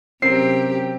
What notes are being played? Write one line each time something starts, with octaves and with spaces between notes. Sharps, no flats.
C3 F#3 C4 C#4 G4 A#4 A#5 C7